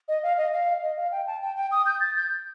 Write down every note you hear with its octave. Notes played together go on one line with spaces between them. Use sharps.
D#5
F5
D#5
F5
D#5
F5
G5
A5
G5
G5
D#6
G6
A6
G6